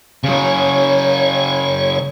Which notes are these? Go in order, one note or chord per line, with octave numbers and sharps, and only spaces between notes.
C#3 F#3 C#5